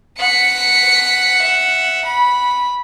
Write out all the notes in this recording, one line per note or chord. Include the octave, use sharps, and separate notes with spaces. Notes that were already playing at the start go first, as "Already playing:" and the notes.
F#5 B6 C#7
E5
B5